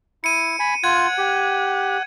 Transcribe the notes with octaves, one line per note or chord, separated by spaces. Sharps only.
E4 C#7 D#7
G#5 B5
F4 F#5 G#6
G4